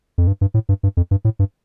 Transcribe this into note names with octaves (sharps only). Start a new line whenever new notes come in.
F2
G2
G2
A2
G2
G2
F2
G2
A2
G2